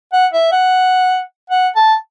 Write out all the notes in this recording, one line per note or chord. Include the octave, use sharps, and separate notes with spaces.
F#5
E5
F#5
F#5
A5